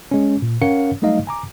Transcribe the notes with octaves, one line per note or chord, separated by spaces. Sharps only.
G#3 C#4
A#2
C#4 A#4 C#5 F5 F#5 C#7
F#3 G3 A3 D#4 D#5 F5
G#5 A#5 D6